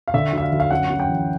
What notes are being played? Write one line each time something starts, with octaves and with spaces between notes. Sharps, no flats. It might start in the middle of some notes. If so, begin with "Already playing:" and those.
F5
D3 E5
D2 E5
F5
D2
F5
F#2 F#5
F#2
G5
E3